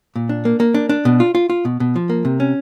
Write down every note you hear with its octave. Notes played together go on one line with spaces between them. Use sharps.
A#2
D4
A#3
A#3
D4
D4
B2
F4
F4
F4
B2
B2
F3
A#3
C3
C#4